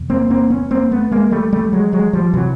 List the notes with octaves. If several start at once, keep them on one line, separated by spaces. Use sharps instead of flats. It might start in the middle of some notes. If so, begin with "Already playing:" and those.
Already playing: E2 C3
A#3 C4
A#3 C4
B3 C#4
A#3 C4
A3 B3
G#3 A#3
G3 A3
G3 A3
F#3 G#3
F#3 G#3
F3 G3
C3 E3 F#3